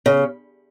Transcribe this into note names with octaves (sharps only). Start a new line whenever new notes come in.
C#3